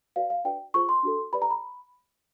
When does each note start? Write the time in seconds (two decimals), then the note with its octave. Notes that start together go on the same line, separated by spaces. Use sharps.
0.16 F#4 B4 D5 F5
0.30 F5
0.44 D4 F#4 B4 D5 G5
0.74 F4 G#4 C5 C#6
0.89 C6
1.03 D4 F#4 A4
1.33 G4 B4 D5 B5
1.42 A#5
1.51 B5